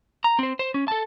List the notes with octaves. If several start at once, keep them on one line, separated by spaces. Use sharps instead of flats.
A#5
C4 C5
C5
C#4
A4 A5